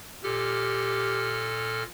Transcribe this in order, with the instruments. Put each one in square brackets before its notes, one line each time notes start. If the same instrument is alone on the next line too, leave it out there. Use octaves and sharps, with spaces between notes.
[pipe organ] A#2 A4 F6 [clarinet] G4